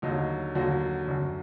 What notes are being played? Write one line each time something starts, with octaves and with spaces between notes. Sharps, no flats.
D#2 D3 F#3 D#4
D#2 D3 F#3 F#4
F#2 D3 F#3